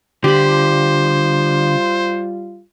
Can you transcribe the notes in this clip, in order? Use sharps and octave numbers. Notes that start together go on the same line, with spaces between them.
D3 G3 F4 G4 C5 B5